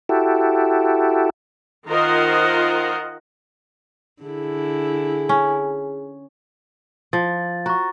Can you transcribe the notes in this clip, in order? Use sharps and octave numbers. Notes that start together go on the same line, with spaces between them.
E4 F#4 G4 A4
D#3 F4 A#4 C5 D#5 F#5
D3 E4 G#4
C#4
F3 A6
F#4 A#5 C#6